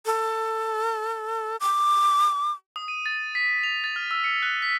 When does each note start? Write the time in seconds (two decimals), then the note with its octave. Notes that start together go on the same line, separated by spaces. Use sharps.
0.05 A4
1.60 D6
2.76 D#6
2.88 D#7
3.06 A6
3.35 B6
3.63 F7
3.84 A6
3.96 F6
4.11 E6
4.24 C#7
4.43 F#6
4.62 B6